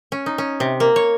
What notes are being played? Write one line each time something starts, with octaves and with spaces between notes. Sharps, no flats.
C#4
D#4
C#4
C3
A#3
C#5